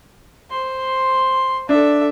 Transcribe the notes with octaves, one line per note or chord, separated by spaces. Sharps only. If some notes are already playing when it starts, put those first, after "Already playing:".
C5 C6
D4 A4 E5